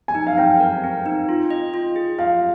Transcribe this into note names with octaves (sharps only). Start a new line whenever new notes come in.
G#5
D#4
F5
C4 G5
A#4
C4
D#4
F4
D#5
F4
G#4
F4 F5